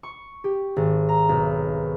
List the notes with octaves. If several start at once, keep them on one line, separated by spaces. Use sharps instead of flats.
C#6
G4
G#1
A#5
B1